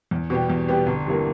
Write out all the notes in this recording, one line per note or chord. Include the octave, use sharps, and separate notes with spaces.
E2
B2 G3 B3 G4
E2
B2 G3 B3 G4
G1
G2 E3 A#3